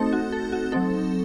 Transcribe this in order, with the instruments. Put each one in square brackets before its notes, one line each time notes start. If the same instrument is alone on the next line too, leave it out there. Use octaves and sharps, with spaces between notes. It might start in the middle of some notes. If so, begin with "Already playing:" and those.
Already playing: [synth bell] A3 C4 D#4 F#4 A4
F#4
A4
F#4
F#3 C4 D#4 A4